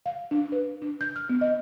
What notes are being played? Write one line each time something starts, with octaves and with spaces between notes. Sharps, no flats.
F5
D4
B4
D4
G6
F6
B3
D#5